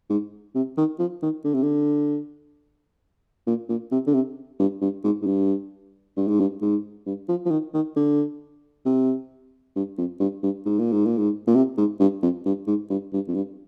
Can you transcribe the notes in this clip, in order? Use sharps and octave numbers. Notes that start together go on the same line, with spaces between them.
G#2
C3
D#3
F3
D#3
D3
C3
D3
A#2
A#2
C3
D3
C3
G2
G2
G#2
G#2
G2
G2
G#2
G2
G#2
G2
F3
F3
D#3
D#3
D3
C3
G2
F2
G2
G2
G#2
A#2
G#2
A#2
G#2
A#2
C3
G#2
G2
F2
G2
G#2
G2
G2
F2
G2